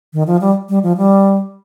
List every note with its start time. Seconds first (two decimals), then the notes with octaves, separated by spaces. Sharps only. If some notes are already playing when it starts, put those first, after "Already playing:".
0.13 D#3
0.27 F3
0.41 G3
0.69 G3
0.83 F3
0.97 G3